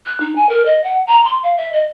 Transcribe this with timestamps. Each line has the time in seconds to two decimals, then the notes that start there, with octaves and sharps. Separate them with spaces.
0.06 F#6
0.20 D#4
0.36 G#5
0.49 A#4
0.66 D#5
0.84 F#5
1.07 A#5
1.25 C6
1.43 F5
1.57 E5
1.73 D#5